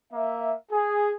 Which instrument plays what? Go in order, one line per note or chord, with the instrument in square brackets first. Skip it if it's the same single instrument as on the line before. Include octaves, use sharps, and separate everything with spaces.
[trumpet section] A#3 E5
G#4